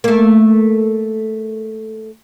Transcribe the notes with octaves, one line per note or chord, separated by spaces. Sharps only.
A3 A#3